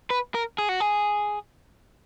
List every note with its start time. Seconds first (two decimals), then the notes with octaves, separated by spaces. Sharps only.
0.10 B4
0.35 A#4
0.58 G#4
0.69 F#4
0.80 G#4